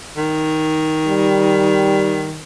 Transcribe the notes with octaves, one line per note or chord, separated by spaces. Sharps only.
D#3
G3